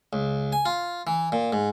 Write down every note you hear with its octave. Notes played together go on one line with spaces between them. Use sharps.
C#2
G#5
F4
E3
A#2
G#2